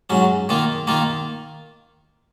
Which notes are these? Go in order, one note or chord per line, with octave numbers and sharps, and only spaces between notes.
G#2 F#3 C#4
D#3 A#3 F4
D#3 A#3 F4